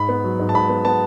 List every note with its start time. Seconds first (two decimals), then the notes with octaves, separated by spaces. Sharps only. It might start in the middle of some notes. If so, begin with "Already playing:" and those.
Already playing: G#2 B5
0.09 B3
0.24 F#3
0.39 G#2
0.49 A5
0.54 G#2 B5
0.69 B3
0.85 B3 A5